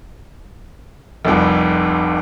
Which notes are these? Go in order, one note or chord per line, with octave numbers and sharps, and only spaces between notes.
F1 C2 F2